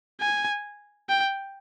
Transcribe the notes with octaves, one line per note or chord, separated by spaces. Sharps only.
G#5
G5